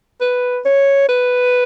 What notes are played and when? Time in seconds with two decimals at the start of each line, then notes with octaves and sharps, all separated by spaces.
0.21 B4
0.65 C#5
1.09 B4